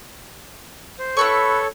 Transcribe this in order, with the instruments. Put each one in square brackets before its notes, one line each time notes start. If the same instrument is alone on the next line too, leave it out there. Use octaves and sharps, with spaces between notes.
[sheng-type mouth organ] C5
[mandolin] E4 B4 C#6 [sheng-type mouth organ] A4 C#5